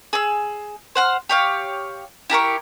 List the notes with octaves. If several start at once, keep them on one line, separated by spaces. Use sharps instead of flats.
G#4 E6
C5 F#5 F6
G4 C#5 F5
E4 G4 A#4 C#6